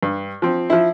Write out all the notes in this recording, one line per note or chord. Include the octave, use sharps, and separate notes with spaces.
G2
F3 C4
F3 E4